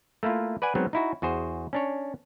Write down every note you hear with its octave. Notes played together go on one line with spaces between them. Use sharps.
A3 A#3 E4 F4
B4 D5 F#5 G#5
F#3 G#3 B3 C4 D#4
D#4 E4 F#4
E2 F#4 G#4 C5
C#4 D4 C#5